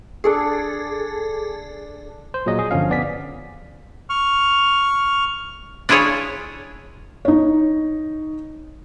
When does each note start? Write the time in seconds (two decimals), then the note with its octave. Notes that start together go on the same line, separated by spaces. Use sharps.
0.24 D4 G#4 A4 D5 D6
2.34 C5
2.46 A#2 F#3 G#4 D#5
2.59 G#4
2.71 G1 D3 F3 C#4 F5
2.90 B3 D5 G#5 B6
4.10 C#6 F6
5.89 D4 E4 F4 G#4 C#5
7.25 D#4 C#5